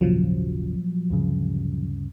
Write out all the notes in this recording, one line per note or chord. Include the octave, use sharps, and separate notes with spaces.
G#1 D#2 A#2 C#3 F3 F#3
D2 G2 C#3